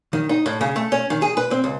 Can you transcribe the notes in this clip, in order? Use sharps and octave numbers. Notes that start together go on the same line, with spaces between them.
D#3
D#4
A2
C#3
A3
C#4
D#3
G#4
B4
C4
C#2